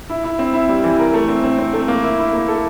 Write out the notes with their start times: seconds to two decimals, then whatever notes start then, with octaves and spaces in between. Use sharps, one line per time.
0.09 E4
0.24 E4
0.39 C4
0.54 E4
0.69 G3
0.84 E3
0.99 A#4
1.14 A3
1.29 C4
1.44 C4
1.58 C4
1.74 A3
1.88 A#3
2.03 E4
2.19 E4
2.33 A#3
2.48 A4